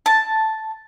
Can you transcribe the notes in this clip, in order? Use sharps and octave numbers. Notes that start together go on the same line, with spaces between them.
A5